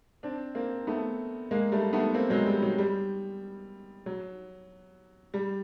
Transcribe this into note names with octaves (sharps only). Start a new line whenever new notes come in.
C4 D4
A#3 C4
A3 B3
G#3 A#3
G3 A3
A3 B3
A#3 C4
F#3 G#3
G3
F#3
G3
F#3
G3